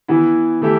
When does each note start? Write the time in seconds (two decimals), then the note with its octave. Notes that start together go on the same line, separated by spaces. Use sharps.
0.08 E3 B3 E4
0.62 E3 A3 E4 G4